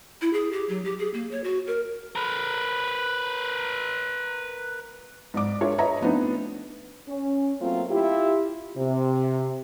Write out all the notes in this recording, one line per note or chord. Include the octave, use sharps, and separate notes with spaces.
E4
G#4
G4
F#3
G4
G#4
A#3
C#5
F#4
A#4
A#4 B4
G#2 D5 D6
D4 F4 G#4 A#4 C#5 E5
B4 C#5 D#5 E5 A#5
F3 A3 B3 C4 D4 D#4
C#4
F#3 A3 A#3 C4 F4
E4 F4 G4
C3